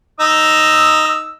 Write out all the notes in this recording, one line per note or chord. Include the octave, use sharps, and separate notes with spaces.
D#4 D#6 E6